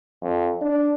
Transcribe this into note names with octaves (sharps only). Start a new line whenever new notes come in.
F2
D4